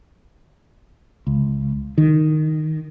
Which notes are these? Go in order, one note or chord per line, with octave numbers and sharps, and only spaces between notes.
C#2
D#3